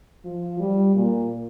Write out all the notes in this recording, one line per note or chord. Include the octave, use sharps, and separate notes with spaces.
F3
G3
A#2